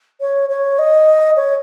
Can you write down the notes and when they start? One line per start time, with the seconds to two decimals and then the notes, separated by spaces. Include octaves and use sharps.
0.20 C#5
0.49 C#5
0.78 D#5
1.36 C#5